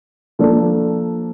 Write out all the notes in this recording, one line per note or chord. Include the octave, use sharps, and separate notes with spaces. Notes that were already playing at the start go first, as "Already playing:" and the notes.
F3 A#3 D4 A4 D5